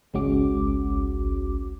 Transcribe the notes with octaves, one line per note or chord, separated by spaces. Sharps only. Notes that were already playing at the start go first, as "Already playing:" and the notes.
G#1 C#2 G#3 C#4 F#4 D6